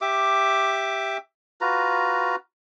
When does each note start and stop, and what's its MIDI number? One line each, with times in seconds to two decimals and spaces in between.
0.01 1.17 67
0.01 1.17 76
0.01 1.17 86
1.61 2.36 65
1.61 2.36 66
1.61 2.36 71
1.61 2.36 82